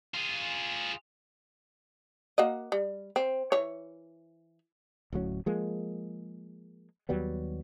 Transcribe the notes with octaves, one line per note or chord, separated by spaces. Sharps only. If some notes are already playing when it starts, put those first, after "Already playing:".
F4 G#4
A#3 F#4 D#5
G3
C4
E3 C#5
D1 A2 F#3 C#4
F3 G#3 A#3
D#2 F#3 G3 B3